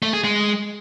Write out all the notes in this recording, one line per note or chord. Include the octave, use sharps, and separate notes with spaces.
A3
G#4
G#3